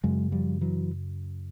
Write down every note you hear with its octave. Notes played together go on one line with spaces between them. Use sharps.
F#2 C#3 F#3 G#3
F3 G3
E3 F#3